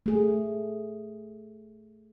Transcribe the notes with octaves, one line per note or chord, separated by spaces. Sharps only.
A3 G#4